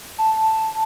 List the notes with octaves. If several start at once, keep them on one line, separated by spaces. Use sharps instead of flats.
A5